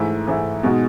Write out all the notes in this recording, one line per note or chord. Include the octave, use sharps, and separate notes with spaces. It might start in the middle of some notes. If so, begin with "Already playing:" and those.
Already playing: G#2 E3 A3 E4
G#2 E3 A3 E4
B2 G#3 D#4 F#4